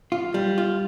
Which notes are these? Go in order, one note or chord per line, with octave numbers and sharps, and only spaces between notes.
F4
G3
F4